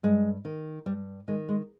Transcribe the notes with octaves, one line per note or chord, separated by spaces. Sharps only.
G2 G#3
D#3
G2 G3
D#3 G#3
G#3